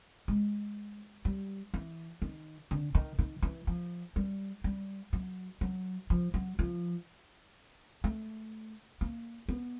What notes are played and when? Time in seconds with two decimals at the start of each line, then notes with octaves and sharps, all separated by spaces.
0.28 G#3
1.25 G3
1.74 E3
2.22 D#3
2.71 D3
2.95 D#3
3.19 D#3
3.42 E3
3.67 F3
4.16 G3
4.64 G3
5.13 F#3
5.61 F#3
6.10 F3
6.34 F#3
6.59 F3
8.04 A3
9.01 A#3
9.49 B3